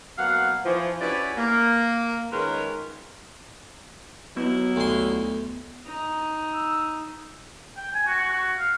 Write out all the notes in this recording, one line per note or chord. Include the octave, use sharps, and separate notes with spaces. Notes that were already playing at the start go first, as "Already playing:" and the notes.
B2 F#3 A#3 F5 F#5
E3 F3
C#4 E4 F#4 G4 B4 D5
A#3
D#3 G#3 C#4 F4 A#4 B4
D#2 F#3 B3 D#4 E4
D2 C6
D#4
E6
G5
G#5
F#4
F#4
F#4
F5